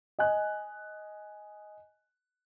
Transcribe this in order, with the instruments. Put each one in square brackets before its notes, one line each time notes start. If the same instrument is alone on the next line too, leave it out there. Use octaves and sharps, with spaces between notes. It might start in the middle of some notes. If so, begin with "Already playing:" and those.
[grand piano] D#5 G#5 F#6